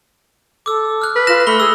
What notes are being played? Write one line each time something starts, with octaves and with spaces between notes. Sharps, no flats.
A4 D6 E6
F6 F#6
B4
F4 F#6 A#6 E7
A3 B5 E6 G7
G#4 E6